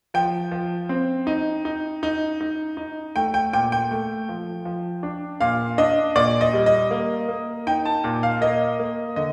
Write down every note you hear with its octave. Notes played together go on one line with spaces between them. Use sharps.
F3 G5
F3
C4
D#4
D#4
D#4
D#4
D#4
A3 G5
G5
A#2 G5
G5
A3
F3
F3
D4
A#2 F5
D4 D#5
A#2 D5
D#5
G3
D#5
A#3
A#3
D#4 G5
A5
A#2
F5
A#3 D#5
A#3
D3 D#5